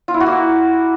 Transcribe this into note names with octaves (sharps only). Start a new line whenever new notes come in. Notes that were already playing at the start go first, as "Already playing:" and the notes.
F4
E4
F#4
A#3